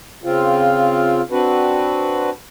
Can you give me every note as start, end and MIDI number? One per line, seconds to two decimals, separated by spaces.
0.24 1.21 49
0.24 1.21 60
0.24 1.21 65
1.31 2.30 60
1.31 2.30 62
1.31 2.30 66
1.31 2.30 71